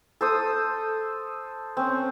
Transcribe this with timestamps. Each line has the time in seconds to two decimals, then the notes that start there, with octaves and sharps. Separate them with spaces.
0.21 A4 C5 D#6
1.77 C4 C#4